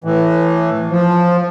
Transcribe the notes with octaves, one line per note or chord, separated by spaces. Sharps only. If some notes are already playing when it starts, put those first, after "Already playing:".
A2 E3
F3